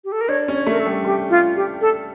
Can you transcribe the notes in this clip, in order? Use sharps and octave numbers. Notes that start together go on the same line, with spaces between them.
G4
A4
A#4
D4 C#5
C#4
C#5
A3 A#4
A4
G3
A3 G4
F4
G4
A4